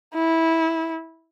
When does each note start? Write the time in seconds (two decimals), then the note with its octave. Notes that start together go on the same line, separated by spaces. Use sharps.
0.15 E4